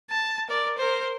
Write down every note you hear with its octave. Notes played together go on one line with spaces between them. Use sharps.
A5
A#4 D5
A#4 C5